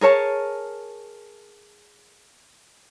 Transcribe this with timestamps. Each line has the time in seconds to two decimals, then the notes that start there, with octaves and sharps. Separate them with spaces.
0.01 G#4 A#4 C#5 A5